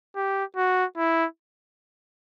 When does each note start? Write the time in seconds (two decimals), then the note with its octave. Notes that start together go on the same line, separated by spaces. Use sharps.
0.16 G4
0.56 F#4
0.97 E4